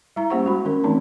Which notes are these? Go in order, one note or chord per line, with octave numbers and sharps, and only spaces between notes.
G3 E4 A#5
A#3 C#4 G4 C5 F#5 C#6
G#3 F#4 B5
D#3 C#4 A#4
E3 A3 C4 C#4 D#4 A5